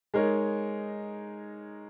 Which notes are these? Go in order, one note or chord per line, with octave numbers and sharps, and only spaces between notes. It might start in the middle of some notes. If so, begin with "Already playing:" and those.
G#3 D#4 A#4 C#5